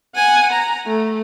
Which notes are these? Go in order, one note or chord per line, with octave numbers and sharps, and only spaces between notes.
F#5 G#5
A#5
A3